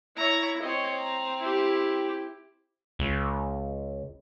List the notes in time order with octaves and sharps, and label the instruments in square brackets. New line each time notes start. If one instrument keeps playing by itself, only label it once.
[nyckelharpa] E4 [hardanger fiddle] C#5 A#5
[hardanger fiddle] C4 [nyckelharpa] C#5 D#5
[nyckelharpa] A#5
E4 G4
[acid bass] C#2